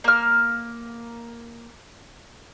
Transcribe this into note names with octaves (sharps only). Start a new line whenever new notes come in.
A#3 F6